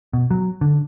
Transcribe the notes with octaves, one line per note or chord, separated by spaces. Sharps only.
B2
F#3
D3